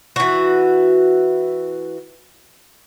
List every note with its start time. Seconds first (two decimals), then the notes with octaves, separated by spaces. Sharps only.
0.16 E3 F#4